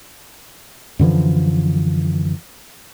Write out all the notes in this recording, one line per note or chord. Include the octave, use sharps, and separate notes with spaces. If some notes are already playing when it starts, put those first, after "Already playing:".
F#2 D3 E3 F3